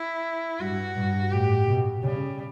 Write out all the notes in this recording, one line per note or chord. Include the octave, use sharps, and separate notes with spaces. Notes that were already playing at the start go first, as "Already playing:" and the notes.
Already playing: E4
G2 F#4
G2
A2 G4
B2
C#3 G3